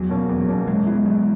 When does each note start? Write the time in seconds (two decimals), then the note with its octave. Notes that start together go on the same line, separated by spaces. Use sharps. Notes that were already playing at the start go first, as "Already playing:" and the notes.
Already playing: E2 F#3
0.09 B2 A#3 C#4
0.29 E2
0.48 B2 A#3 C#4
0.68 F#2 G#3
0.87 E3 G#3 B3 E4
1.06 F#2